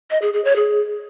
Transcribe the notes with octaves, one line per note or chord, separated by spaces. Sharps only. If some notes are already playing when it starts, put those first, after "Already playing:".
D#5
G#4
G#4
C#5
G#4